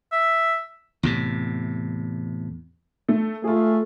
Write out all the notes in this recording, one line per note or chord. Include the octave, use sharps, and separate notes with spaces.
E5
E2 A2 C3
A3
A3 F4 G#4